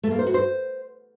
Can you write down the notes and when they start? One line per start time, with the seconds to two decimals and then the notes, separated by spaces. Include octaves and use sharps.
0.03 A3
0.11 A#3
0.19 C5
0.27 F#4
0.34 C5